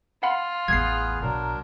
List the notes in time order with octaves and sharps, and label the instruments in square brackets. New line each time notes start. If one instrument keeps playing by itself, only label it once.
[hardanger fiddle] F4 [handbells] F5 F#5 B5
[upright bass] A1 E2 [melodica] B3 G#4 B4 [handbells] G#6 C7
[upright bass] B1 [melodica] F#3 D4 A#4